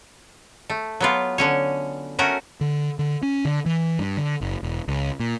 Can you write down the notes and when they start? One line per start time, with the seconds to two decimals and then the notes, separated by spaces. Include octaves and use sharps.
0.70 A3
1.00 F#3 B3 F4
1.38 D3 C#4 C#5
2.19 A3 C#4 F#4 A#4
2.61 D3
2.99 D3
3.23 C#4
3.45 D3
3.66 E3
3.99 G2
4.17 D3
4.41 F#1
4.63 E1
4.88 C#2
5.20 A#2